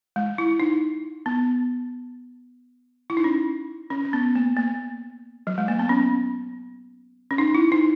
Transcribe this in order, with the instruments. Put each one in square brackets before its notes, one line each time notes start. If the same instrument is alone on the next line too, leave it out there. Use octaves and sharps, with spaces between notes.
[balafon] G#3
E4
D#4
B3
E4
D#4
C#4
C#4
C#4
B3
A#3
A#3
F#3
G#3
A#3
B3
C#4
C#4
D#4
E4
D#4